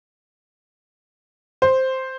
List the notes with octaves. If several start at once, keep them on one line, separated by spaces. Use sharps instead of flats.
C5